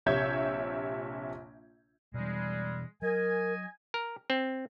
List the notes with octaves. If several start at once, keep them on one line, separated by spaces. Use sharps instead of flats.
A#1 C3 C#5 E5 G6 G#6
B2 E3 G3 G#3
F#3 A#4 D#5 G#5
A#4
C4